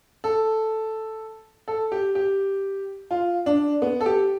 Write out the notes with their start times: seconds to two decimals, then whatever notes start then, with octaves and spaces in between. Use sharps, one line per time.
0.24 A4
1.68 A4
1.92 G4
2.15 G4
3.11 F4
3.46 D4
3.82 B3
4.01 A4
4.06 G4